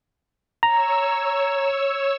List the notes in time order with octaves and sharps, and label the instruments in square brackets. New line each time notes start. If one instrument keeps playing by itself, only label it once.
[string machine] C#5 E6 [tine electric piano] A#5